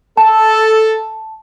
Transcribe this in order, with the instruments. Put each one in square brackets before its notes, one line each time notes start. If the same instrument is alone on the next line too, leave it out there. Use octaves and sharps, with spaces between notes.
[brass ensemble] A4 [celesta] A5